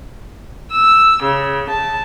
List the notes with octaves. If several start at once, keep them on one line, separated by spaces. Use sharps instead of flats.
E6
C#3
A5